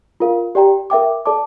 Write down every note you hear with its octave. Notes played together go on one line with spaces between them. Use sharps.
F4 A#4 F5
G4 D5 G5 A#5
A#4 E5 G5 D6
A4 D5 A5 D6